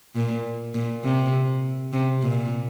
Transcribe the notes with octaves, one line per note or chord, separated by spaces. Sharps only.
A#2
A#2
C3
C3
A#2